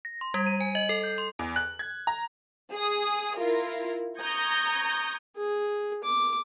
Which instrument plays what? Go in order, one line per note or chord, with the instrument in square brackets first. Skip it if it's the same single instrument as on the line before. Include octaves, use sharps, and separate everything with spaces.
[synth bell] A#6
C6
G3
D#7
G#5
D#5
A4
G6
C6
[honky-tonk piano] E2
F#6
G#6
A#5
[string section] G#4 D#6
E4 F4 A#4
A#5 C#6 D#6 G6 G#6 A#6
[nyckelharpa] G#4
D6